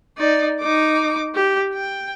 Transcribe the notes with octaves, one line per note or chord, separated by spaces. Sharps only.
D#4 D5
D#4 D6
G4
G5